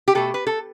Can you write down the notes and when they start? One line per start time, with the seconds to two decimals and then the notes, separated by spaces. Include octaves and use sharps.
0.08 G4
0.15 B2 A3 A4
0.34 B4
0.47 A4